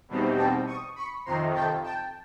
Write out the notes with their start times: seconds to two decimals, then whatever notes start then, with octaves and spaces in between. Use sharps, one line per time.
0.09 E2 B2 G3 C4 D#4
0.37 G5 A5
0.67 C#6 D#6
0.96 B5 C#6
1.25 F2 C3 D#3 A#5 C6
1.54 G5 A5
1.84 G5 A5